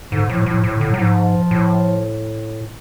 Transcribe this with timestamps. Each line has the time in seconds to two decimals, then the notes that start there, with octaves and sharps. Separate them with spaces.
0.11 G#2 D3
0.29 A2 F3
0.42 F#3
0.46 A2 F3
0.64 A2
0.73 D3
0.81 A2
0.90 F#3
0.94 A2
0.99 G#2 F3
1.51 A2